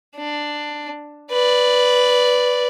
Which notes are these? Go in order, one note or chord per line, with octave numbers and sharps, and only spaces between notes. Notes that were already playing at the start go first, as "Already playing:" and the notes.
D4
B4 D5